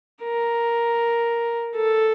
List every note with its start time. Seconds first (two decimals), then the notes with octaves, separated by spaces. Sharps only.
0.23 A#4
1.76 A4